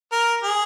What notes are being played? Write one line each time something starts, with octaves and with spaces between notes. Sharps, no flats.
A#4
G#4